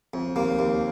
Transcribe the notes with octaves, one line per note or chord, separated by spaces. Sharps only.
F2
D#2 A#3
D#2